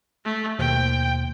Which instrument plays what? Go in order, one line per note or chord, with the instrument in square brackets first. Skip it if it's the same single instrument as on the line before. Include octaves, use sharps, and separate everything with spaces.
[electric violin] A3
[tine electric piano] D#2 B2 C5 [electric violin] G5